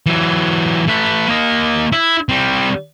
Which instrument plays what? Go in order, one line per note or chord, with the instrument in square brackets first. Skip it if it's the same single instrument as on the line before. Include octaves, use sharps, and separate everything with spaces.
[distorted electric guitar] E3 F#3
A3 B4
A#3 D#5
E4
G3 C4